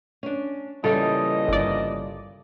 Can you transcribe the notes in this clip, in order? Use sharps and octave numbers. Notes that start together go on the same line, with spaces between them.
C#4 D4
A#2 C#3 E3 G3 A4 D#5
G1 D5